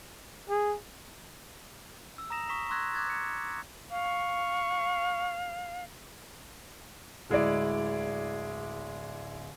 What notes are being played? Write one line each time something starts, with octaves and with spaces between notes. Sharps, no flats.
G#4
E6
A#5 D#6 A#6 E7 F7
C#6 D#6 B6 E7
C6 C#6 E6 F#6 G#6 A#6
D6 F#6 G#6 A6
G#6 C#7
F5 C#6
D1 G#3 E4 D5